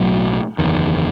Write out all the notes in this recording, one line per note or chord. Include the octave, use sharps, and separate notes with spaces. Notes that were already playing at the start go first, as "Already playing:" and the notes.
Already playing: B1 A2 F#3
F#1 E2 D#3